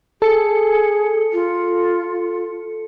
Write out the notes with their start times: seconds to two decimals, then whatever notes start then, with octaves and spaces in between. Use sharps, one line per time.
0.22 G#4 A4 C#7
1.33 F4